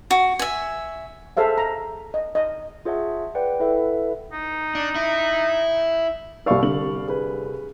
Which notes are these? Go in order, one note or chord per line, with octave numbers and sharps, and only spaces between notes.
F#4
E5 G#5
G#4 A4 C5 E5 F5
A#5
D#5
D#5
F4 G#4 C#5 E5 F#5 A5
B4 D5 F#5 G5
E4 A4 B4 E5 F#5
D#4
D4
E4
C2 D5 F5 C#6 E6
C2 D3 F#7
G#4 B4